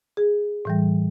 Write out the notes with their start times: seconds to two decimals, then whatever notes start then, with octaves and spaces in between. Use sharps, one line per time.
0.17 G#4
0.65 A2 E3 G3